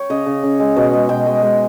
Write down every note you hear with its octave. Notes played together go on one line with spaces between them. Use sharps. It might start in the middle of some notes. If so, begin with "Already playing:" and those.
Already playing: C#5 G5
C#3 D#5
C#3
C#3
G#3
B2
G#3
B2 G5
G#3
G#3